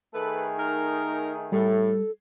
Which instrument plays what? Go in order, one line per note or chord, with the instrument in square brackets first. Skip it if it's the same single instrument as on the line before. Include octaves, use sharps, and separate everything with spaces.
[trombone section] D#3 A3 G#4 [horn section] A4 B4
[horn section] D#4 A#4
[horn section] A2 [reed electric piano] G3 [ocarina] A4